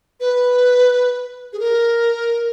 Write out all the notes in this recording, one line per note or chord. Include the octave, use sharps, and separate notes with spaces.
B4
G#4
A#4